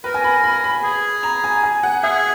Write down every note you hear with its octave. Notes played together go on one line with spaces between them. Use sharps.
A#4 B4
G#5
B5
B5
B5
G#4
A#5
G#5
G#5
F#5
G#4 E5